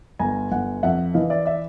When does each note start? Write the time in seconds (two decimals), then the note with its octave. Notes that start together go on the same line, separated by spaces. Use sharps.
0.19 G1 G#5 A#5
0.51 G1 F#5 G#5
0.83 F2 E5 F#5
1.14 E3 D#5 F5
1.30 D5 E5
1.46 D5 E5